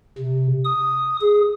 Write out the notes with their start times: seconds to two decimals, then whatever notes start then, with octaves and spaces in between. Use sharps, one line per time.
0.18 C3
0.64 D#6
1.21 G#4